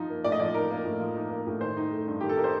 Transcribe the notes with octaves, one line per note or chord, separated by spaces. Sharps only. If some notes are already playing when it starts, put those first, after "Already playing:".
Already playing: F3 D#4
A#3
A2 D5
D#5
F3 D5
D#4 A#4
A#3
A2
F3
D#4
A#3
A2
D#3 C5
D#4
A3
G2
D#3 G4
A4
D#4 A#4
C5